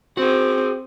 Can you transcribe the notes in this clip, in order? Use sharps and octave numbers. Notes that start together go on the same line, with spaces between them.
C4 F#4 G#4